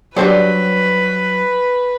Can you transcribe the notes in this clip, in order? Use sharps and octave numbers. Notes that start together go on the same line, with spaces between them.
F#3 G3 C4 D4 B4 C5